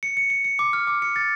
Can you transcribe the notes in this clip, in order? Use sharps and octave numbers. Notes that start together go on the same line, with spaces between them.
C#7
C#7
C#7
C#7
D6
F6
D6
C#7
A6